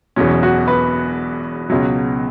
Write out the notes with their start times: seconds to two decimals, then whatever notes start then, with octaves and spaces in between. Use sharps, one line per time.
0.16 E1 E2 B2 F#3 C#4
0.43 F#4
0.68 B4
1.70 C#2 B2 F#3